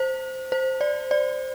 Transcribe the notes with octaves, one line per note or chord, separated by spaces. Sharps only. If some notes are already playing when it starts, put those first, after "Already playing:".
Already playing: C5
C5
D5
D5